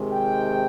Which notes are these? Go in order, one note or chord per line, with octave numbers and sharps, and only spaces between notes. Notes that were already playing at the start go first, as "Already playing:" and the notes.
Already playing: C3 D#3 G#3
G5